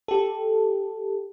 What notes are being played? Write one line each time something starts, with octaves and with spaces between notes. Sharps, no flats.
G4 A4